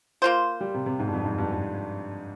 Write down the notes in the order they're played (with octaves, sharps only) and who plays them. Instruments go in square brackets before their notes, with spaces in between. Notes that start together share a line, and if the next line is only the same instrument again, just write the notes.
[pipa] A#3 F4 C5
[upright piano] G3
C3
C3
G#2
G2
F2
G#2
G2
G2